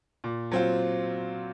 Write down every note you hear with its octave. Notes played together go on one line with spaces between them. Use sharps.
A#2
F#3 C4 F4